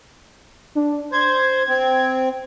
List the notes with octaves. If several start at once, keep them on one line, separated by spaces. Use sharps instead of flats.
D4
C5 G#6
C4